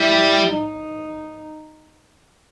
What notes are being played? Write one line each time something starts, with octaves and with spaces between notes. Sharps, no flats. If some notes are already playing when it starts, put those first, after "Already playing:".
Already playing: G3 E4
D#4